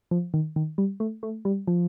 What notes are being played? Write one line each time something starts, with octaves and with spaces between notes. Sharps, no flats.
F3
D#3
D#3
G3
A3
A3
G3
F3